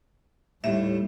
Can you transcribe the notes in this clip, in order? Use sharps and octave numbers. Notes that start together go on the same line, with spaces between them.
D#2 A2 G3 E5